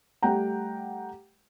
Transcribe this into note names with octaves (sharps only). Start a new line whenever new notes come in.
G3 A3 F#5 G5 A#5